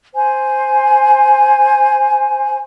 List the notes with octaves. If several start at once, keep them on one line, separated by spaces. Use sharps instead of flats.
C5 G#5